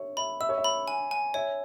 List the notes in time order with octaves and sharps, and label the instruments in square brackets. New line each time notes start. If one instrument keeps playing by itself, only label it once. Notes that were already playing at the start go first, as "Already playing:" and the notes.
Already playing: [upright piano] C#5 E5
[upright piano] E5 [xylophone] B5
[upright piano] E5 [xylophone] E6
[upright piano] C#5
E5
[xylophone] B5
G#5
G#5
[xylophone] C#5 [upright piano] E5